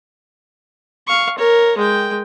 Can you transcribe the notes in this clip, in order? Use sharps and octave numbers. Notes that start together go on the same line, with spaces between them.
F5 C#6
A#4 C#5
G#3 G5